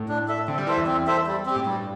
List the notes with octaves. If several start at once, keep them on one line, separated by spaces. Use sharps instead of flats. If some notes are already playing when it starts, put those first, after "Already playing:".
Already playing: A2
D4
A4 E5
D3 C4
G3
E3 A4 C5 E5
E2
C4
A4 C5 E5
G3
C4 G4
A2
G2 G3